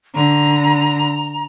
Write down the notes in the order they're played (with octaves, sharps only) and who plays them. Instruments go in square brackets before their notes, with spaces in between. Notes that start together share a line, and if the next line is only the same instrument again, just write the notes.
[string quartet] D3 [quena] A#5